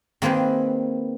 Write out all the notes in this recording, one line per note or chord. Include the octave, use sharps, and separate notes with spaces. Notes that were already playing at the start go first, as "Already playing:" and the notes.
D#3 A#3 C4 G#4 B4